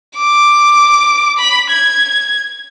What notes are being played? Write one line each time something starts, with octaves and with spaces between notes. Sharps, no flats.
D6
B5
G#6